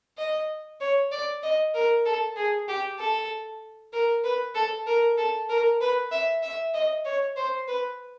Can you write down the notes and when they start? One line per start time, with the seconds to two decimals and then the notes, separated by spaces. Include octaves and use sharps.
0.18 D#5
0.81 C#5
1.12 D5
1.43 D#5
1.74 A#4
2.06 A4
2.37 G#4
2.68 G4
2.99 A4
3.93 A#4
4.24 B4
4.55 A4
4.87 A#4
5.18 A4
5.49 A#4
5.81 B4
6.12 E5
6.43 E5
6.74 D#5
7.05 C#5
7.37 C5
7.68 B4